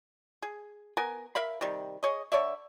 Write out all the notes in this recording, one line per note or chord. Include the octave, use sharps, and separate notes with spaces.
G#4
B3 A#4 G#5
A#4 E5 F5 B5
C3 D#3 G3
G#4 C#5 D#5
D3 C#5 D5 E5